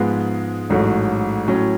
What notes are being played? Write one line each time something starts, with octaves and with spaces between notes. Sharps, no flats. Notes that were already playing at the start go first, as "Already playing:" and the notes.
Already playing: G#2 F3 G#3 B3
A1 G#2 F#3 A3
A2 F#3 C#4